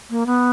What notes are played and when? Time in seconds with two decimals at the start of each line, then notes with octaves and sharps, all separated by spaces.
0.10 A#3
0.26 B3